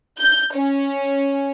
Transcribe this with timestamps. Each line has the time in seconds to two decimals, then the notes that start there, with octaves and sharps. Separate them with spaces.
0.19 G6
0.55 C#4